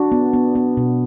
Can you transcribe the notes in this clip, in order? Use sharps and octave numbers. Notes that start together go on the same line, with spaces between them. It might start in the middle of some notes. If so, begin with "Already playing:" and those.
Already playing: D4 F#4
B3
B3
B3
B2